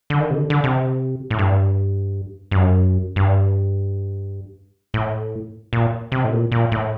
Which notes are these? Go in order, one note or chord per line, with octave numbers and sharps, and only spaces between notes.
D3
D#3
C3
D3
D3
C3
A2
G2
G2
F#2
G2
A2
A#2
C3
A2
A#2
A#2
A2